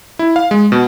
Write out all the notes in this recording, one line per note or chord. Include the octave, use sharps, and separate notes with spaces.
E4
F5
G#3
B2